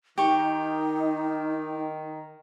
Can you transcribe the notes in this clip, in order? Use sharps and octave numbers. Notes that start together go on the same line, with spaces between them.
D#3 D#4 G4 C#6